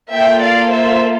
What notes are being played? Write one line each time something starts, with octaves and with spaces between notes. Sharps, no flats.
A#3 F4 A4 E5 G5
D5 F5
C5 E5